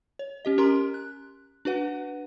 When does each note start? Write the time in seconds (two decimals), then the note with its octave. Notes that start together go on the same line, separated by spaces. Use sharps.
0.19 C#5
0.45 C#4 G4 D#5
0.58 C#4 G4 A#4 A#5 C6
0.94 F#6
1.65 D4 F#4 B4 F#5